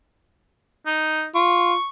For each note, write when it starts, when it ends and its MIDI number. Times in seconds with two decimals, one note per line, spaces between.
0.86 1.26 63
1.35 1.74 65
1.35 1.89 85